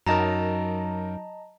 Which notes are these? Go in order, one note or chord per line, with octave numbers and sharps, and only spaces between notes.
F#2 F#3 D#4 A#4 D#5 A5 A#5